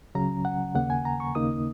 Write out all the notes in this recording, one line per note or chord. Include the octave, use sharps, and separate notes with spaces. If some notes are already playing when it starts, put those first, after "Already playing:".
C#2 C#3 F#3 C#4 A#5
F#5
D#2 C#3 A#3 F#5
G#5
A#5
C#6
D#2 C#3 A#3 D#4 D#6